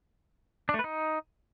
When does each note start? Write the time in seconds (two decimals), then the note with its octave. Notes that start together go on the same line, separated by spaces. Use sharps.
0.69 D4
0.74 A3
0.79 B4
0.84 D#4